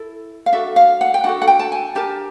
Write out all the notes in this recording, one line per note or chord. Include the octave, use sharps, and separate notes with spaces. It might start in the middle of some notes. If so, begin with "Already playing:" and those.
Already playing: E4 A4
F5
D4 F#4 A4 E5
F5
F#5
G5
D4 F#4 A4 F#5
F#5
G5
A5
G#5
D4 G4 A#4 A5